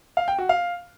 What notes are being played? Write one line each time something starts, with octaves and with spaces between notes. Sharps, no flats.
F5
G5
F#4
F5